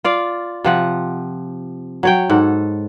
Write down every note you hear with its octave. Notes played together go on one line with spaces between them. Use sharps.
F4 D5 F5
C3 F3 F#5
F#3 C#5 G5
G#2 A4 F#5